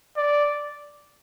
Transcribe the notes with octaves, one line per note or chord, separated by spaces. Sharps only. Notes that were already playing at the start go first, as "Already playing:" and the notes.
D5